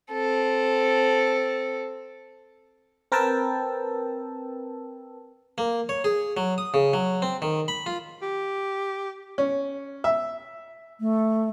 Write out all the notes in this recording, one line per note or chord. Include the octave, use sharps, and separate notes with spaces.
C4 A4
C4 A#4 B4 G5 A5 E6
A#3
C#5
G#4
F#3
D#6
C#3
F#3
C4
D#3
B5
F4
G4
C#4
E5
A3